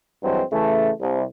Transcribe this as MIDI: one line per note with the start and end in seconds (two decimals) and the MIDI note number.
0.23 0.41 43
0.23 0.41 52
0.23 0.41 54
0.23 0.41 56
0.23 0.41 60
0.52 0.90 49
0.52 0.90 52
0.52 0.90 57
1.00 1.23 36